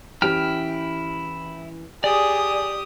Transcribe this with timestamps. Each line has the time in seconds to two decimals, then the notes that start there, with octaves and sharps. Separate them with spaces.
0.22 E3 C#4 E4 G4 G5 F6
2.04 G4 G#4 D5 D#6